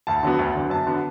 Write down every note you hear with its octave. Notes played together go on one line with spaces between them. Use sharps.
D2 A5
D3 F#3 B3
D2
D3 F#3 B3
F#2 A5
D3 F#3 B3